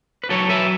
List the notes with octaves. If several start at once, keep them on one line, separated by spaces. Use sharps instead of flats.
B4
F#3 A4 C#5
B4 E5